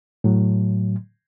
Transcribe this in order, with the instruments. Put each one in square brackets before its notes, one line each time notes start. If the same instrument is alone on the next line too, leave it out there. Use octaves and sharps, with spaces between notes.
[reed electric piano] A2 F#3